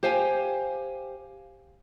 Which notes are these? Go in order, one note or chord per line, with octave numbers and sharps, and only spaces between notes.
G4 C5 F5 G5 G#5